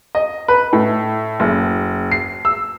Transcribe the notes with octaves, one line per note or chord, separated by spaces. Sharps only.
D#5
B4
A2
F#1
C7
E6